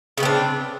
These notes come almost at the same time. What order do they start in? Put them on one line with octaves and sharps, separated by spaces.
C#3 B3 C4 D4